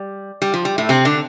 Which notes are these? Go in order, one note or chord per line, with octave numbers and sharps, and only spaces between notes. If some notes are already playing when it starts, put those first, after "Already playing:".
Already playing: G3
G3
F3
G3
A2 A3
C3 C4
D3 D4